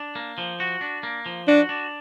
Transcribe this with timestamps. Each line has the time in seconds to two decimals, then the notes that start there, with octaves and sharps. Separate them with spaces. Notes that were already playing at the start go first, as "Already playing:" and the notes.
Already playing: D4
0.15 A#3
0.38 F3
0.60 F#4
0.81 D4
1.03 A#3
1.26 F3
1.48 D4 F#4
1.69 D4